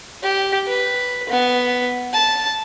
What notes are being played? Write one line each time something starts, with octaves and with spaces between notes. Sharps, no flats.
G4
B4
B3
A5